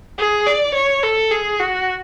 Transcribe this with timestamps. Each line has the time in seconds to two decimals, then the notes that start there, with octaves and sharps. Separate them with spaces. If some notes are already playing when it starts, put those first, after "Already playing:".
0.18 G#4
0.47 D5
0.74 C#5
1.03 A4
1.31 G#4
1.59 F#4